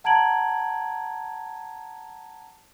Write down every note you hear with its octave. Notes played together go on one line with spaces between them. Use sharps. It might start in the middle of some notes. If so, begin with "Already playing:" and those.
F#5 A5 A#5 G#6 D7 F#7